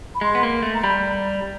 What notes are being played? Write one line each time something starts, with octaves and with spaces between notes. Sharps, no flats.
B5
G#3 C6
B3
A#3
A3
A#5
G3 B5